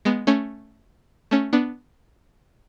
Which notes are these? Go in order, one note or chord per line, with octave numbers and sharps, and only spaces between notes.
G#3 B3
A3 C#4
A3 C#4
B3 D4